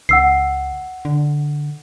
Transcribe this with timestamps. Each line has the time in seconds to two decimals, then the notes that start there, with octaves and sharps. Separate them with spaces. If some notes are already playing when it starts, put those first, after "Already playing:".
0.09 C#2 F#5 E6 C7
1.05 D3